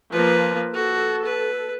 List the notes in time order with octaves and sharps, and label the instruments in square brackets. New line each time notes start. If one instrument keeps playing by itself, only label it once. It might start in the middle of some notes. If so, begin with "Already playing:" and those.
[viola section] F3 [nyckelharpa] A#3 B4
[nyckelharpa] F#4 [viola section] A4
[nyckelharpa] B4